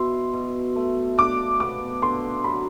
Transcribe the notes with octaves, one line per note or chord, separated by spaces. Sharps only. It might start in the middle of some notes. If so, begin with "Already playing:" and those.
Already playing: B2 E4 C6
B2
A3
D4 D6
B3 D6
D3 C6
F#3 B5